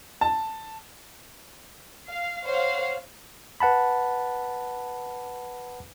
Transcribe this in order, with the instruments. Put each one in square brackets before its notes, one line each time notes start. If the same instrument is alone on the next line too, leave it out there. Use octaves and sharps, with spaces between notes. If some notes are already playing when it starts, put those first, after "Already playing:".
[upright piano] A5
[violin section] F5
C5 C#5 F5 F#5
[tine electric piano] B4 F#5 A5 B5